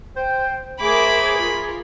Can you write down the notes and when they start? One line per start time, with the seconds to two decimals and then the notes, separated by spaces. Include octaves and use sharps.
0.16 C5 G5
0.81 A3 G#4 A#4 C5 B5 D6
1.37 F4 A#4